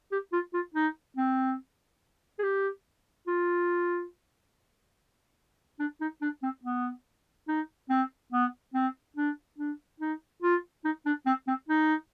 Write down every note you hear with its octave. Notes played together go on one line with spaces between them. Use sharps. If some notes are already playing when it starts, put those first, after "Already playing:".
G4
F4
F4
D#4
C4
G#4
G4
F4
D4
D#4
D4
C4
B3
D#4
C4
B3
C4
D4
D4
D#4
F4
D#4
D4
C4
C4
D#4